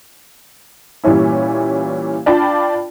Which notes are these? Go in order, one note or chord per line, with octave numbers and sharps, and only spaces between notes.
A#2 E3 G3 C#4 E4
D4 F4 D5 G5 A5 B5